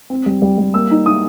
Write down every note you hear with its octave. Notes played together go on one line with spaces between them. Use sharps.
C4
G3
G3
G3
A#3 E6
D#4
D#4 D#6